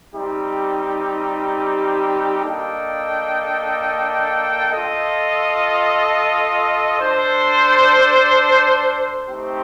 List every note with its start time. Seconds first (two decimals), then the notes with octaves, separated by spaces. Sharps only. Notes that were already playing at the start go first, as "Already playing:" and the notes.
0.13 G3 C4 D#4 G4
2.42 A#3 D4 A4 D#5 G5
4.71 F4 A4 D#5
7.00 D4 A4 C5
9.29 A3 C4 D#4 G4 C5